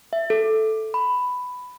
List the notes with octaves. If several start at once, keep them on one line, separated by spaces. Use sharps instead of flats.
E5
A4
B5